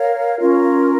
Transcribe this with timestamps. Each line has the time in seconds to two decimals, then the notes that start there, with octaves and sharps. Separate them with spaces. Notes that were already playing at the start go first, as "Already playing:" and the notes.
Already playing: A#4 C#5 F5
0.39 C#4 F4 A#4